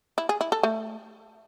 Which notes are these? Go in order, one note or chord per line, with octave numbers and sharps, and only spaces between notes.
E4
G#4
E4
A4
A3